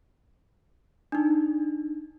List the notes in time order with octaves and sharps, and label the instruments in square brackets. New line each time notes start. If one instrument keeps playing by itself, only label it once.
[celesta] D4 D#4